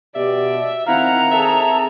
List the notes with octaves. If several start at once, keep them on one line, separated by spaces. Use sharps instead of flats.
B2 G4 D5 E5
D#3 C4 E4 F5 F#5 A#5
G#4 A4 E5